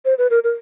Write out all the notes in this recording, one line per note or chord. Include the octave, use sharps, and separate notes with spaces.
C5
B4
A#4
A#4